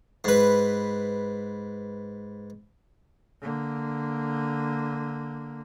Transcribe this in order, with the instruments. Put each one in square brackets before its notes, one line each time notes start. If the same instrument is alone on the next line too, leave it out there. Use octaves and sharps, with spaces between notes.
[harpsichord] G#2 B4
[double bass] D3 A#3